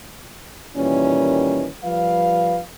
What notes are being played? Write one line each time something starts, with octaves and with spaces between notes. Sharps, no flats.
A#2 D#3 E3 G3 C#4
F3 G3 B4 F5